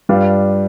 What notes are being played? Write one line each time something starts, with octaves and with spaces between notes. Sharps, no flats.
G2 G3 D4 F4